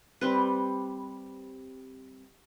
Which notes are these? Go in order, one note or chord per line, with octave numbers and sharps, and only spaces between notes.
G3 C4 B4